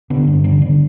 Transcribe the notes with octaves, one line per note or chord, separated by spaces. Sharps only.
D3 B3
G2
D3 B3
D3